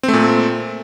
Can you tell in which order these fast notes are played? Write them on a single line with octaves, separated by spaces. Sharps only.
C4 A3 A#2